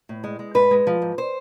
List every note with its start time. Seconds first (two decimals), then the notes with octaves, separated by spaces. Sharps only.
0.09 A2
0.24 G#3
0.39 G#3
0.55 G#2 B4
0.71 G#3
0.87 F3
1.02 G#2
1.18 C5